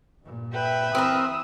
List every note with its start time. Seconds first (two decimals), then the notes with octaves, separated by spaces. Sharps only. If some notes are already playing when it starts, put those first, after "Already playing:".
0.22 G2 A#2
0.54 B4 E5 G5
0.95 E3 C4 A#4 D#6 E6